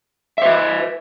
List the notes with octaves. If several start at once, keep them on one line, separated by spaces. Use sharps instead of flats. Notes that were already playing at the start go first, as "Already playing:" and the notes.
B4 C5 E5